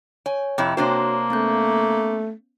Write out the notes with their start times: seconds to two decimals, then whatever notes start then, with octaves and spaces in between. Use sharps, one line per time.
0.26 C#5 G#5
0.58 F2 C3 E4 G5
0.77 C3 A#3 D4 F#4 C5 C#5
1.30 A3 B3 C#4 G6